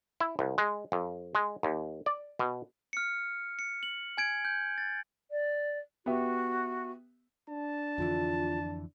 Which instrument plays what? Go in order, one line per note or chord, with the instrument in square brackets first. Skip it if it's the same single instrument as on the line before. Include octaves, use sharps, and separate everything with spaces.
[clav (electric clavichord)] E4
C2
G#3
F2
G#3
D#2
D5
B2
[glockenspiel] F6 C#7
C#7
F#7
G#5 G#6 D7
G6
A6
[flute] D5
[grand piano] B3 G4 E5 [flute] F#4
[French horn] D4 [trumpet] A5
[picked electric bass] F2 D3 E3 [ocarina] F4